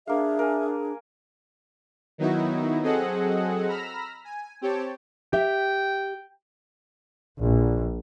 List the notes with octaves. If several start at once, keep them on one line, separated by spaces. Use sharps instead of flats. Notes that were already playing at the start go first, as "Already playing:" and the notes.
A#3 D4 G#4 E5 F5
A#4 G#5
D#3 F#3 B3 D#4 E4 F#4
F#3 C4 G#4 A4 D#5 F#5
A#5 B5 E6 F6 A#6
G#5
C4 G4 C#5 G5 A5
G4 E5 G5
A#1